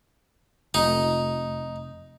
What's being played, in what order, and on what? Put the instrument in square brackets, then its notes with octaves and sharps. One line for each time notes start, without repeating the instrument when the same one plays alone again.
[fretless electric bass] F1 [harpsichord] D#4